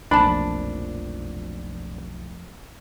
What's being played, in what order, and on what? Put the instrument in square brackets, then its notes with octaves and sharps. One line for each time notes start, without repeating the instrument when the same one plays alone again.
[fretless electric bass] F1 A#2 F3 [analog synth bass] B1 [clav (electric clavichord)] D4 [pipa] A5 B5